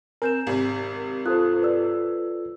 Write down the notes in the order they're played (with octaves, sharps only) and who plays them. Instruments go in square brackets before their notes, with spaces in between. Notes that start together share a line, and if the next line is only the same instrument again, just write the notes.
[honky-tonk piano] C4 [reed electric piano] A#4 [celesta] G#5 G6 E7
[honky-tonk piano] G#1 C3 [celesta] G4
[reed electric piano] F4 A4 C5 [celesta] D#6 F#6
[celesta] B4 D5 E6